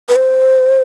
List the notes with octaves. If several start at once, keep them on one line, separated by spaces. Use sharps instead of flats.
B4
C5